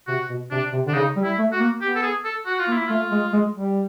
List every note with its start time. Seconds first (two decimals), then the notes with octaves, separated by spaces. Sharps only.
0.08 C3 F#4
0.29 B2
0.51 C3 D4
0.73 C3
0.86 D3 D4
0.94 C#3 D#4
1.16 G3
1.24 E4
1.39 A3
1.53 F#4
1.60 A#3
1.81 B3 G4
1.96 A4
2.03 G#4
2.25 A4
2.46 F#4
2.60 F4
2.68 A#3
2.73 E4
2.87 A3 F4
3.12 G#3
3.33 G#3
3.55 G3